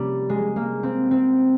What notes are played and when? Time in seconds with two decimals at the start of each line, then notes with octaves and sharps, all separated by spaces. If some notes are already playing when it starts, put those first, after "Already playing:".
Already playing: C3 F3 G3 A#3 C#4
0.30 G#3
0.56 A#3
0.83 C4
1.11 C4